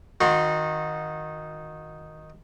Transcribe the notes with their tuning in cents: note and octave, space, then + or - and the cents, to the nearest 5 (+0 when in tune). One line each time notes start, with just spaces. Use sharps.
D#3 +0 F#4 -35 C6 +0